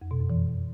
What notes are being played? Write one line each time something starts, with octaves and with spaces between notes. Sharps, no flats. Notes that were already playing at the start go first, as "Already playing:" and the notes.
F2
B2
F#2
E3